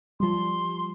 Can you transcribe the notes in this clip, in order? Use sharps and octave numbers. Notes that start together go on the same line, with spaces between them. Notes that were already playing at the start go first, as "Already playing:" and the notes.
F3 G3 C6